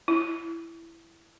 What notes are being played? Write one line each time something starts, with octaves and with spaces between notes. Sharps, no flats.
E4